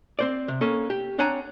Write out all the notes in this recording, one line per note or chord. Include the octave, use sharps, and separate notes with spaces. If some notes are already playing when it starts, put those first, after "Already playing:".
C4 C5 D5
C3
A#3 C#4 A4
G4
C4 D4 C#5 F#5 G#5 A#5